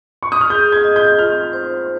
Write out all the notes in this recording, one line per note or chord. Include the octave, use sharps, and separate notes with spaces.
C#6
D#6
F6
G#4 G6
G#6
D#5
G6
F4 F6
C5